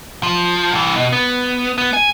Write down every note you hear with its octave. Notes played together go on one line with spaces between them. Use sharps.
F3
C2 E3
B2
B3
B3
G#5